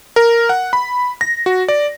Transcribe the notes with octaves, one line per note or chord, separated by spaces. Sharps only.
A#4
F#5
B5
A#6
F#4
D5